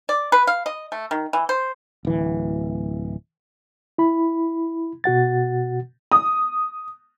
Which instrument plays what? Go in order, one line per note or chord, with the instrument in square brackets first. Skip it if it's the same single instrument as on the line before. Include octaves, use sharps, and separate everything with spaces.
[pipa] D5
B4
F5
D#5
A3
D#3
E3
C5
[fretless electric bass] D1 E3
[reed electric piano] E4 B5
B2 F#4 F#5 A6
[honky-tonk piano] D#6